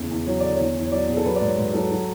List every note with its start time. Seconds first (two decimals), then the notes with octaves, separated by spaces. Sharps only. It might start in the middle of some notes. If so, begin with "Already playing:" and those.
Already playing: E2 C#3
0.10 E2
0.26 F#3 C#5
0.40 D3 D5
0.54 E2 C#5
0.76 E2
0.84 C#5
0.92 F#3 D5
1.08 B2 G#4
1.16 A4
1.25 F#3 B4
1.36 G#2 D5
1.47 C#5
1.57 G#2 B4
1.74 F#3 A4
1.91 F#3